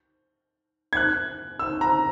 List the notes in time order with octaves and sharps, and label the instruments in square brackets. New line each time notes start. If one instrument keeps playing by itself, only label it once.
[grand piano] G#6
F#6
E6
A#5